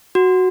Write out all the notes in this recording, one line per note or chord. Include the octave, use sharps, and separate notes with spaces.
F#4